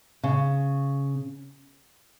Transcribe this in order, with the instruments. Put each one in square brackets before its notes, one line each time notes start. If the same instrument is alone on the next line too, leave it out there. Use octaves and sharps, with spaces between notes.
[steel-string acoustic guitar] C#3